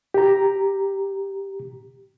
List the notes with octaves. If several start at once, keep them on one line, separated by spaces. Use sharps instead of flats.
G4 A#5